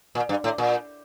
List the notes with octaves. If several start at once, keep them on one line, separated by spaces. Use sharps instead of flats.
A#2
G2
A2
A#2